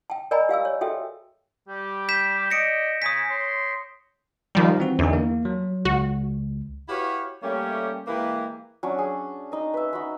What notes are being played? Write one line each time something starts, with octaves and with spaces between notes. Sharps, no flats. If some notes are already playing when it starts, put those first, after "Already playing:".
G5 A5
A#4 D5 D#5 G#5 A#5 B5
G4 F5 G#5 E6
C#5
F#4 G#4 A4 E5 G5
G3 G4
G6 B6 E7
D5 D#5 A#6 C#7 D7
C#3 G#5 D#6 B6
C#5 C6
D#3 F3 G3 F5 A#5
E3 C4 F#4
E2 D3 D4 D#4
A#3
F#3
C#2 F#4
E4 F#4 G4 B4 C#5 F5
G3 A3 A#3 C#4 G4 C#5
E3 G#3 A#3 E4 G4 B4
F#3 C#4 D4
G#4
D#4 D#5
B4 E5
D#4 F#4 B5